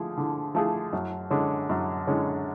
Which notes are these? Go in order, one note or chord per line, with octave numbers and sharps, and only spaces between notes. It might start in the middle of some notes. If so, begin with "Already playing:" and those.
Already playing: D3 F3 A3 F4 G#4
D3
F3 A3 F4 G#4
F#2
D3 G#3 C#4
F#2
D3 G#3 C#4